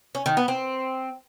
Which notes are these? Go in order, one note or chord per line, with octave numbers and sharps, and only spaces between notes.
C#4
D#3
B3
C4